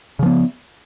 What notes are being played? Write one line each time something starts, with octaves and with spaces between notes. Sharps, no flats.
C#3 F3 B3